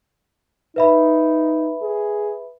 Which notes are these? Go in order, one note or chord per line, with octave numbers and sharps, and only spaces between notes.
D#4 B4 E5 B5
G#4